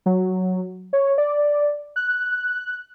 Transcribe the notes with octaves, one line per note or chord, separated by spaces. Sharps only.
F#3
C#5
D5
F#6